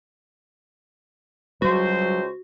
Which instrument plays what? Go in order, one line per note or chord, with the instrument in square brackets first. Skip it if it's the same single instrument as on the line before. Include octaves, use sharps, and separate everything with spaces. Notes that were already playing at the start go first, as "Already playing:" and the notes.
[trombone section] C#2 C5 [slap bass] F#3 G3 [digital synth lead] F#4